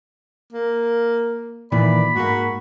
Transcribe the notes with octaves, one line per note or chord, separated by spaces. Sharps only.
A#3
A#2 D#3 E3 D5 B5
G#2 A#3 F#4